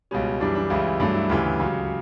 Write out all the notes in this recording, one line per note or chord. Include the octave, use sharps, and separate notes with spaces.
C#2 B2 G3 C#4
F#2 E3 G3 D4
D4
C#2 C#3 E3 G3 E4
G2 F#3 A3 D4
E4
D2 C#3 E3 G4
C#2 C#3 F#3